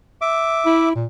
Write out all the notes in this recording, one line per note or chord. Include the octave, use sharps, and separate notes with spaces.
E5 D6
E4
A#2